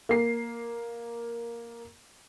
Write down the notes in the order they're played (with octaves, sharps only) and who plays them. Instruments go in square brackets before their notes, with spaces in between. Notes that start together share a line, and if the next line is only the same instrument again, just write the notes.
[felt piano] A#3 C7